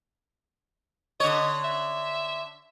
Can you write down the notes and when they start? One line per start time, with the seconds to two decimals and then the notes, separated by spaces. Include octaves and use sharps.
1.20 D3 C#5 D#5
1.64 E5